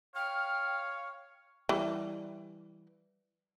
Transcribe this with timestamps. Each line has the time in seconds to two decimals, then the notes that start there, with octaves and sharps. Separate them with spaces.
0.16 C#5 F5 G5 F6
1.69 E3 G3